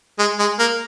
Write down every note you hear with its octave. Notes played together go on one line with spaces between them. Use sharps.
G#3
G#3
A#3